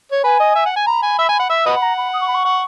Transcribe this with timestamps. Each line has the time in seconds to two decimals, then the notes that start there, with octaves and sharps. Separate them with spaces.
0.12 C#5
0.24 B4 G#5
0.40 D#5
0.55 E5
0.66 F#5
0.76 G#5
0.87 A#5 B5
1.03 G#5
1.19 E5
1.29 G#5
1.40 F#5
1.50 E5
1.66 B4 D#5 F#5
1.75 B5
1.82 A#5
1.97 B5
2.13 D#6
2.21 C#6
2.27 B5
2.34 C#6
2.45 F#5